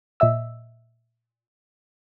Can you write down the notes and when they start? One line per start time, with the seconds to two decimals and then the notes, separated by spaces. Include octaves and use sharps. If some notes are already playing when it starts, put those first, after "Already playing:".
0.20 A#2 D#5 E5 E6